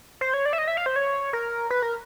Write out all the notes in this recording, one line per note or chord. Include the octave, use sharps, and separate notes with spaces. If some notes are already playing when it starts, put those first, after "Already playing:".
C5
C#5
D5
E5
D#5
E5
F5
C5
C#5
A#4
B4
A#4